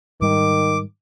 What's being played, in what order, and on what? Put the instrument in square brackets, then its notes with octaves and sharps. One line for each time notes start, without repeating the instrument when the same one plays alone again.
[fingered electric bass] G#2 G3 [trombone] D#3 [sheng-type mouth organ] D6